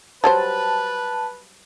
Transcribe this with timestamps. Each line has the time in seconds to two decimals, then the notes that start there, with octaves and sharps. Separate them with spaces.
0.24 F#3 G3 B4 C5 A5